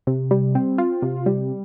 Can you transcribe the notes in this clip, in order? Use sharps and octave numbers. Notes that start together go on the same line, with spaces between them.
C3
G3
C4
F4
C3
G3